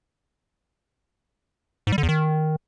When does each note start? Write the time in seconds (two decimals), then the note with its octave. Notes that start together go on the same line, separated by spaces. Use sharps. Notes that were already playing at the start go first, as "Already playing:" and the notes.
1.87 G#2
1.92 G3
1.98 D3
2.03 E2
2.09 D#3